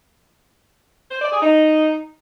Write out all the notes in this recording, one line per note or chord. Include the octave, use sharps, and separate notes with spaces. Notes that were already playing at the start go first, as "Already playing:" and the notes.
C5
D5
G#4
D#4